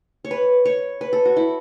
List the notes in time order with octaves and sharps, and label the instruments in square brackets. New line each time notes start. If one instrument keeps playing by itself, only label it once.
[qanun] C#5
B4
C#5
B4
A4
F#4
E4